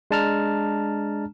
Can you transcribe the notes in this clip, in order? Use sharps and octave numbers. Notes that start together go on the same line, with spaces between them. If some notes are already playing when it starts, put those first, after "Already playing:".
G#3 D4 A5 A#5 F6